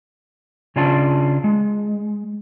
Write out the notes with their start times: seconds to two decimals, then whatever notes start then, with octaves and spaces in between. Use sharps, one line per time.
0.76 C#3 C#4 D4 F4 A5
1.44 G#3